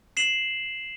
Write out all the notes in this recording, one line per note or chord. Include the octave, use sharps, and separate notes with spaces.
C7 E7 F#7